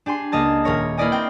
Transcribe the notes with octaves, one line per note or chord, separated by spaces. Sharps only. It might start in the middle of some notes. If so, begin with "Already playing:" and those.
D4 G4 G#5 C6
C#2 A#3 D#5 A5 G#6
D#1 A#4 C#5 A#6
A#3 E4 B4 D5 D#5 G#5
C4 G5